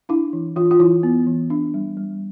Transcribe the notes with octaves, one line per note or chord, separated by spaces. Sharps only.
D4 E4
E3
E3 F4
F4
E3 E4
B3
E3
D4
G3
G3